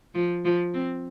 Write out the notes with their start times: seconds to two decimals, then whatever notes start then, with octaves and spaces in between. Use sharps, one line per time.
0.14 F3
0.45 F3
0.74 C4